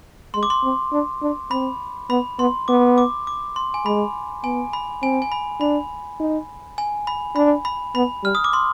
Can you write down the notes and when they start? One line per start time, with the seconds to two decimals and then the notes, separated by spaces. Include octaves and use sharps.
0.34 G#3 C6
0.43 D6
0.50 C6
0.63 C4
0.92 D4
1.22 D4
1.51 C4 B5
2.10 B3 B5
2.39 B3 C6
2.68 B3 D6
2.98 D6
3.27 D6
3.56 C6
3.74 G#5
3.85 G#3 B5
4.44 B3 G#5
4.73 B5
5.02 C4 G#5
5.22 G#5
5.32 B5
5.60 D4 B5
6.20 D#4
6.78 G#5
7.07 B5
7.36 D4 B5
7.65 B5
7.95 B3 B5
8.23 G3 F6
8.35 D#6
8.44 D6
8.53 C6